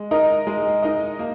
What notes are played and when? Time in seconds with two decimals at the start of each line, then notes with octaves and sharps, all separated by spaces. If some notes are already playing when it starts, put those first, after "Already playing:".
Already playing: G#3
0.11 D#4 A#4 D#5
0.47 G#3
0.82 D#4 A#4 D#5
1.19 A#3